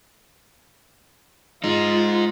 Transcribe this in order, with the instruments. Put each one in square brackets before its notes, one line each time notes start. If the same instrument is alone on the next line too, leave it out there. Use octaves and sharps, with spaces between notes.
[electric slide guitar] G#3 D#4 [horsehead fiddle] F4